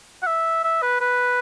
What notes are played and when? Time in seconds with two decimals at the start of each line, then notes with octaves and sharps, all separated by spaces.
0.22 F#5
0.27 E5
0.64 E5
0.82 B4
1.01 B4